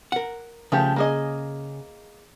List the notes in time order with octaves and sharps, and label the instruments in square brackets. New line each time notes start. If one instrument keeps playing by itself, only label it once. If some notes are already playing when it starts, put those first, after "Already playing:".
[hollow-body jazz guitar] A#4 F#5
[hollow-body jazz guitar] C#3 [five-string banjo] F3 A3 G4
[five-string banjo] A#3 G#4 D#5